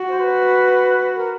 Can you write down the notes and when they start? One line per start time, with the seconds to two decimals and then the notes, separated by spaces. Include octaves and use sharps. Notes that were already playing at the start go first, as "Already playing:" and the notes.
Already playing: F#4
0.09 C5
0.19 B4
1.16 A#4